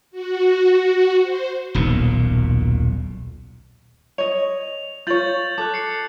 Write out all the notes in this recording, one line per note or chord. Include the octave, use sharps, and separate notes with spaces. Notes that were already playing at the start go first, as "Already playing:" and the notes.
F#4
C5
D#1 B1 A#2
C#5 D#5 F7
F4 C#5 G6 A6 F#7
A4 D6 F#6
C7 C#7